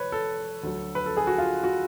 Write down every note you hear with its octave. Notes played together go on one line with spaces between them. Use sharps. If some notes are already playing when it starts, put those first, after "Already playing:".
Already playing: F1 B4 C#5
A4
D2 D3 F#3
B4
A4
G#4
F#4
F4
F#4